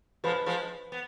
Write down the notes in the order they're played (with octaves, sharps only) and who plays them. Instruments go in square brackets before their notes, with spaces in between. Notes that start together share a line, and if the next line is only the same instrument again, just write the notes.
[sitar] F3 G#3 [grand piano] B4 B5
[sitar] F3 G#3
B3